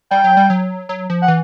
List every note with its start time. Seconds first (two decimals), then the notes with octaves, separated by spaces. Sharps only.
0.11 G3 G5
0.24 F#3
0.37 G3
0.50 F#3
0.89 F#3
1.10 F3
1.22 F#5
1.28 E3